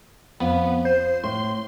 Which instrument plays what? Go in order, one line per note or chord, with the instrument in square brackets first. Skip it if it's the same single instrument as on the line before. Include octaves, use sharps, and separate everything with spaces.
[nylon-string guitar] F2 [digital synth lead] B3
[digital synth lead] C5
[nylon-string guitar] A2 [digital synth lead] C6